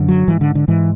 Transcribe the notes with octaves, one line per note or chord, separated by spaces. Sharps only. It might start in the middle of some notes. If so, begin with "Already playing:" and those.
Already playing: F#2 D3
F#3
G#2 E3
D3
D3
G#2 E3